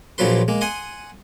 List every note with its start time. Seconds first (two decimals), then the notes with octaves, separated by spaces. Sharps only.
0.18 A#1 A#2 F3 F#3 B4 C6
0.48 G#3 A#3
0.61 F#5 G#5 C6 D#6